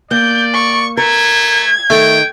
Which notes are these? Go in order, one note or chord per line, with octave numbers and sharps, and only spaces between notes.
A#3 D5 G6
C#6
A3 A#4 G#6
D#3 A3 G5